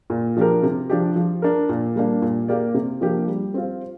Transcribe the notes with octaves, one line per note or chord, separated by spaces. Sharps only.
A#2
F3 D4 G4 A#4
C3
F3 D4 G4
F3
D4 A#4
A#2
G3 A#3 D4
A#2
A#3 G4 A#4 D5
C3
F3 A#3 D4 G4
G3
C4 F4